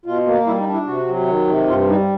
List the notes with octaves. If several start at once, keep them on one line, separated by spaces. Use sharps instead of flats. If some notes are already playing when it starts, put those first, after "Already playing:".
B2 F4
A#3
G3 E4
D#4
D4
E4
C3 F#4
F#3
D#3
C3
G2 F4
G3 D#4